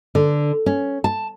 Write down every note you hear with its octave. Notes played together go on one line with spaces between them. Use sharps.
D3
C#4
A5